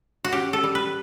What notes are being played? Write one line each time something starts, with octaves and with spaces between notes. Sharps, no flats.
F#4
C#4 G4
A4
G3
B4